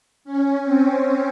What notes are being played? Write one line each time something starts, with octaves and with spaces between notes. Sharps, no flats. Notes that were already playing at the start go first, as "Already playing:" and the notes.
C#4
C4